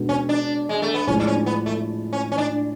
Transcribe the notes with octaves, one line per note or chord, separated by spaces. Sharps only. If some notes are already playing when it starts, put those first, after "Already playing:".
Already playing: B2 G#3 B3 D4 F#4
C#4
D4
G#3
A3
B3
A2 F3 G#3 C#4
D4
C#4
B3
A3
C#4
C#4
D4